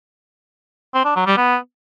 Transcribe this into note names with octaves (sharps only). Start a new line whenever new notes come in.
C4
D4
F#3
G3
B3